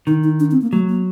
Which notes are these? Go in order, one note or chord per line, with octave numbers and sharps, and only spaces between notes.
D#3 D#4
D#4
D4
C4
A#3
F#3 A3
A#3